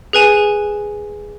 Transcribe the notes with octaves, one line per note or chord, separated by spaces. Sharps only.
G#4 B4 G#5 E7